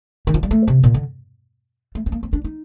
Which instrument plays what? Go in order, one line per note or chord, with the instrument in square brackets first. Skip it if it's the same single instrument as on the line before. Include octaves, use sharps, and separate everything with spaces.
[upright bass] D#3
F3
G3
A3
C3
A#2
D3
A3
C4
A#3
C4
D4
D#4